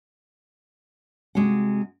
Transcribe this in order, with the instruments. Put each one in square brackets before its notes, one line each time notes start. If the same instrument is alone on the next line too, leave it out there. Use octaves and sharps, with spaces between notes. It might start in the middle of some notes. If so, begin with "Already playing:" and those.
[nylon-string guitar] C3 G#3 F#4 F#5